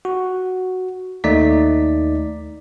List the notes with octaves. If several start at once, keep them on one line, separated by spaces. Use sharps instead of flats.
F#4
D#2 A3 D#4 D5 B6